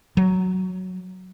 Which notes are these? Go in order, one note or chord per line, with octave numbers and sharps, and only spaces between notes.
F#3